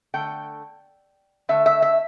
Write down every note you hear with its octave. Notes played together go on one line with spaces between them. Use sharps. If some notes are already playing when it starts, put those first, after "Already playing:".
D3 A3 G5
D3 A3 E5
E5
E5